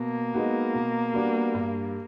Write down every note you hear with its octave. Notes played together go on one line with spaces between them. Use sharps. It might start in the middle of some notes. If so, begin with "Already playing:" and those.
Already playing: B2 A#3
G#3 B3 D#4 F#4
B2
G3 B3 D4 F#4
G2